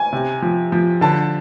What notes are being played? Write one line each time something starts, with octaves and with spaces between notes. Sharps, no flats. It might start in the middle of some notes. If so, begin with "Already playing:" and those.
Already playing: G#5
C3
F3
F3
D3 A5